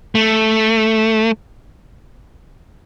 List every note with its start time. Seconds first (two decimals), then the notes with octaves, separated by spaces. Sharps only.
0.15 A3